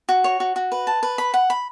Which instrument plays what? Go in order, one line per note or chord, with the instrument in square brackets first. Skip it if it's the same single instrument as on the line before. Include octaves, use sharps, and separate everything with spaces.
[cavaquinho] F#4
C#5
F#4
F#4
B4
A5
B4
B5
F#5
B5